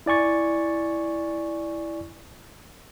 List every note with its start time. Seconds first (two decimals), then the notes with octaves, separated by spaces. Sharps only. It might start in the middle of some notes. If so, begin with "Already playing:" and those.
0.06 E4 D5 G#5 C#6 A6